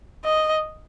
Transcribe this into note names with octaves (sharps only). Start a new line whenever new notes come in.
D#5